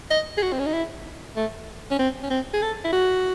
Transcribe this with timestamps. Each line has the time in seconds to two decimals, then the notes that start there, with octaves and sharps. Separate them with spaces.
0.11 D#5
0.37 G#4
0.43 F#4
0.53 C4
0.59 C#4
0.66 D#4
0.73 E4
1.36 A3
1.91 C#4
1.99 C4
2.23 C#4
2.30 C4
2.53 G#4
2.62 A4
2.85 E4
2.93 F#4